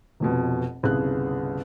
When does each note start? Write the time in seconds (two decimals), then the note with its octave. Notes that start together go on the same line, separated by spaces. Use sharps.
0.20 F1 F2 B2
0.83 G1 C2 C#3 G#4 F#6